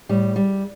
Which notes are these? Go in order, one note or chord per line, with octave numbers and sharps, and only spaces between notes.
A2 G3
G3